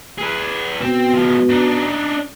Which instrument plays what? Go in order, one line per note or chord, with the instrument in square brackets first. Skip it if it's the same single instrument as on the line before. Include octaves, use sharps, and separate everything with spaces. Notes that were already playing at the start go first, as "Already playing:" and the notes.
[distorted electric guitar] G#4 B4
[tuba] B2 [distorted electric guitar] C4
[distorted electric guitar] F3 G#3
D4 D#4